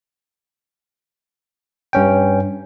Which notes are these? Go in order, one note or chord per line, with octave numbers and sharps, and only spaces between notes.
G2 C#4 G5